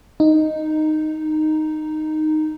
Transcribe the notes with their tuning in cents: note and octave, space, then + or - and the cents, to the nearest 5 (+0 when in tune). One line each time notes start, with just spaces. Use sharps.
D#4 -10